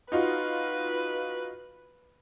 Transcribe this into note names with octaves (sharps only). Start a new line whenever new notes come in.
D#4 F4 F#4 B4